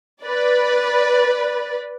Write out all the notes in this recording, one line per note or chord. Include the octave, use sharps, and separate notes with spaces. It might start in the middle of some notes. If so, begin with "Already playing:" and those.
B4 D5